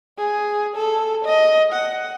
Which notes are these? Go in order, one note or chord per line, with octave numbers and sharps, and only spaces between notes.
G#4
A4
D#5
F#5